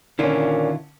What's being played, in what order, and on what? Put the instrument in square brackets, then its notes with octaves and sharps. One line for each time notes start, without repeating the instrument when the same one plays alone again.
[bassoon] A#2 [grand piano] D3 C#4 [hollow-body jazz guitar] D#3 E4 F4